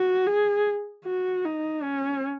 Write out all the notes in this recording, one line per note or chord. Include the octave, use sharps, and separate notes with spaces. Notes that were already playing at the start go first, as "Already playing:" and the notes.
Already playing: F#4
G#4
F#4
D#4
C#4